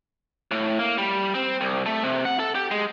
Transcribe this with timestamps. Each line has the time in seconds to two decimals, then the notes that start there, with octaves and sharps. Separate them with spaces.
0.51 A2
0.79 A#3
0.98 G3
1.34 C4
1.61 C2
1.86 A3
2.03 C3
2.25 F#5
2.39 A4
2.55 G4
2.71 G#3